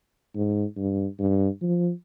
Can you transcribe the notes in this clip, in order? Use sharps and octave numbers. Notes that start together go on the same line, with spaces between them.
G#2
G2
G2
F3